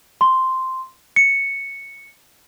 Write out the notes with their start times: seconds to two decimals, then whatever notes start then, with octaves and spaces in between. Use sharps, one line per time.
0.21 C6
1.16 C#7